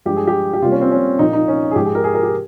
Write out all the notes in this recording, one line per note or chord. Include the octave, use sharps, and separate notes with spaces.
G2 F3 G#3 G4
G#4
G4
G4
C3 G3 A#3 F4
C#4
C4
C#4
A#2 F3 A#3 D#4
D#4
C#4
G#4
G#2 F3 G#3 G4
G#4
A#4
G#4
A#4
G4